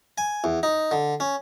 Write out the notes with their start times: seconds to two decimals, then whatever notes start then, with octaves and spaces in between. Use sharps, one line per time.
0.18 G#5
0.44 E2
0.63 D#4
0.91 D3
1.20 C#4